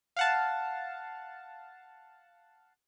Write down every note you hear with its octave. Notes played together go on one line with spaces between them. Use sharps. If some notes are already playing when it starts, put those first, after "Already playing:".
F5 F#5 A5